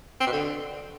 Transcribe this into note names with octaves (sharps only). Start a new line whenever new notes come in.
C4
B2
D3